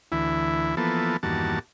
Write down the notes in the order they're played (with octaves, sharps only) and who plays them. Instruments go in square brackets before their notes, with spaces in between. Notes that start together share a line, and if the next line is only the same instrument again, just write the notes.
[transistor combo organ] D2 E3 E4
E3 F3 A#3 B3 A4
E2 G2 D#3 A#3 F#4 A5